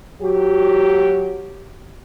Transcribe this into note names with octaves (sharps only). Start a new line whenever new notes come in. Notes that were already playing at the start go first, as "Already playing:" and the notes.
F#3 F#4 G4